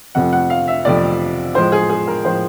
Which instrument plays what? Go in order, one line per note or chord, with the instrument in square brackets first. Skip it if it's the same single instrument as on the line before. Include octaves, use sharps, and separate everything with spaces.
[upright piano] F2 C3 F3 A3 F#5
F#5
F5
E5
F2 C3 F3 A3 D5
A2 F3 G#3 C5
G#4
G#4
A#4
A2 F3 G#3 C5